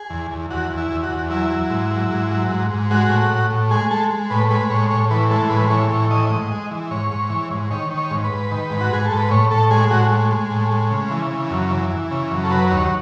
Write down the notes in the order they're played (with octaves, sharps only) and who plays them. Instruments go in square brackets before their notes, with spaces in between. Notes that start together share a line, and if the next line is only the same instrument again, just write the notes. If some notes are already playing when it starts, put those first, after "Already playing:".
Already playing: [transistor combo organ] G#4
E2
E2
E2 F#4
E2
E4
E2
F#4
E2
F#3 E4
F#3
G#2
F#3
G#2
F#3
G#2
G#2
G#3 F#4
A2
A2
A2
G#3 G#4
G#3 A4
G#3
A2 B4
G#3 B4
A2 C#5
A2 C#5
E3 B4
G#3 A4
A2 B4
E3 C#5
A2 C#5
E3 D#5
G#2
G#3
E3
G#2 C#5
G#2
E3
G#2
D#3 C#5
D#3
C#5
G#2
B4
G#2
D#3
G#2
F#4
G#2 G#4
G#2 A4
B4
A2 C#5
A2 A4
G#3 G#4
A2 F#4
G#3
G#3
A2
G#3
C#3
E3
C#3
F#2
E3
E3
C#3
F#2
A4
F#3 B4
D#2 C#5